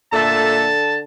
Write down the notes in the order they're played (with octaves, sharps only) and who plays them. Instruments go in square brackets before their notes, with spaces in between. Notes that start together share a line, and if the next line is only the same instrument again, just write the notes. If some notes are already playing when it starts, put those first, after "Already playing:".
[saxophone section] A#2 A4 E5 [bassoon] D3 [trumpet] A5